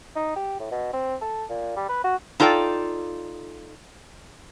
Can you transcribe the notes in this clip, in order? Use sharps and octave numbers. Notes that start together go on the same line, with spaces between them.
D#4
G4
A2
B2
C4
A4
A#2
G3
B4
F#4
D#4 F4 A4 D5 G5